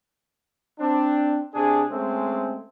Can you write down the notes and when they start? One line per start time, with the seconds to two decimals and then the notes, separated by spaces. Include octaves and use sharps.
0.79 C4 D4
1.54 C3 D4 G#4
1.90 G#3 A3 C4 C#4